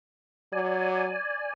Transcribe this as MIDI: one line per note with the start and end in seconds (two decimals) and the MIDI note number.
0.53 1.14 54
0.53 1.53 74
0.53 1.53 80